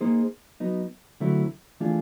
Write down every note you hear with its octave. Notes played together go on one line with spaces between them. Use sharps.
A#3 D#4 G#4 C5
F#3 B3 D#4
D3 F#3 A3 C4 E4
E3 A3 D4 F4 G#4